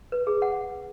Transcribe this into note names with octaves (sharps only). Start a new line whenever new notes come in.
B4
G#4
F#5